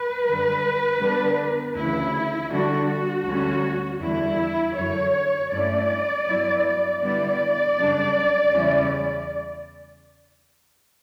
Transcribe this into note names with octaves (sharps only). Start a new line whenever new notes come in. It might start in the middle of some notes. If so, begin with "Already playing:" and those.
Already playing: B4
F#2 D3 G3
D3 G3 B3 D4
D2 C#3 E3 E4
D3 G3 D4 F#4
F#4
D2 D3 G3 C#4
E2 D3 G3 E4
F#2 D3 F#3 C#5
G2 F#3 A3 C#4 E4 D5
G2 F#3 B3 E4
D3 G3 B3 E4 D5
F#2 C#3 G3 D4
E2 C#3 G3 C#4 E4